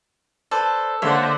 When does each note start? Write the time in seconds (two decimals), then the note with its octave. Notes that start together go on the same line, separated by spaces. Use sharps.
0.51 A4 B4 C5 D5
1.02 D3 A#3 C5 C#5 E5 F#5 C6